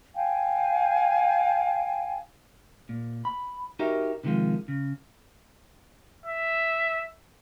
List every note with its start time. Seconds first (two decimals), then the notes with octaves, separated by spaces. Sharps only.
0.15 F5 G5 G#5
2.89 A#2
3.25 B5
3.79 D#4 F#4 G4 A#4 D#5 E5
4.24 C3 D#3 F3 G#3 F4
4.68 C#3
6.26 E5